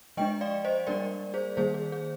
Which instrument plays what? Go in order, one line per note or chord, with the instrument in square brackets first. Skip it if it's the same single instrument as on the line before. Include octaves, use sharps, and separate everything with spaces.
[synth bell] F3 G#3 D4 D#5 G5
D5 F5
C5 D#5
G3 A#3 D4 A#4 D5
G#4 C5
D#3 G3 A#3 G#4 C5
G#4
G#4